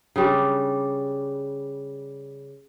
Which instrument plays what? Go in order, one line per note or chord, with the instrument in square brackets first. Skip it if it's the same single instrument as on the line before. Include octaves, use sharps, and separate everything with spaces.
[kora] C#3 G3 D4